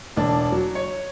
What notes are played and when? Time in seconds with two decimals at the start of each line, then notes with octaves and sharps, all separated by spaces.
0.16 E1 D4 A5
0.52 F#3
0.75 C#5